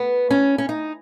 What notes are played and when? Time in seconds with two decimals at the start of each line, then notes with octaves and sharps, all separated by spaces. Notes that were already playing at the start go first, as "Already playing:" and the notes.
Already playing: B3
0.31 C#4
0.58 C#4
0.69 D#4